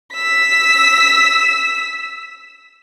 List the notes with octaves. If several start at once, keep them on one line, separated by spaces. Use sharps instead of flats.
E6 B6